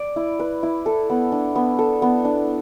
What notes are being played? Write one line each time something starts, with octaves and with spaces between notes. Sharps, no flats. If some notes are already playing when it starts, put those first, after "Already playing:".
Already playing: D5
E4
B4
E4
A4
B3
D4
B3
A4
B3
D4